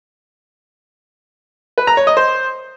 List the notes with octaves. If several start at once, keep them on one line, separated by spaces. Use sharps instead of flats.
B4
A#5
C#5
D#5
C5